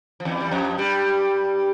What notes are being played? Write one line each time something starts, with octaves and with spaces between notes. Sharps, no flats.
F3
E2 E3
G3
F2 F3
G2 G3